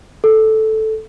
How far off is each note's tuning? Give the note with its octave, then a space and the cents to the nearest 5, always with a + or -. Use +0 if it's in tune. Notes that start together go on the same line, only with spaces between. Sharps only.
A4 -5